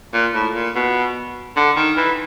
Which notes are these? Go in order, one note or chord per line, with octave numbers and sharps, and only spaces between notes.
A#2
A2
A#2
B2
D3
D#3
E3